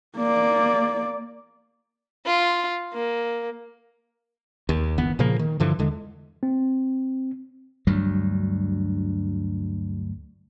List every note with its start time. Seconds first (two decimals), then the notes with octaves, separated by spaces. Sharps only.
0.17 A#3 D5
2.27 F4
2.94 A#3
4.69 D#2
4.98 G1 E3 B3
5.19 A#2 C#3 F3 A#3
5.39 D#3
5.60 G2 D3 E3 F3
5.79 E2 D3 G#3
6.43 C4
7.87 D2 G2 F#3 G3